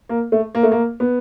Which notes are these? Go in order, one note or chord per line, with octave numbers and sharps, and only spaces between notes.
A#3
A3
A#3
A3
A#3
B3